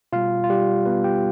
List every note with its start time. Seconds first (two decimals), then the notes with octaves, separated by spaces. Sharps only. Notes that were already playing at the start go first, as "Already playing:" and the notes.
0.13 B2 G3 F4 F5
0.44 F4
0.50 G3 G4
0.86 B3 B4
1.04 G4 G5